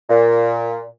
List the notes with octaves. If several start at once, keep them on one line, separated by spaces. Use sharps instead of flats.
A#2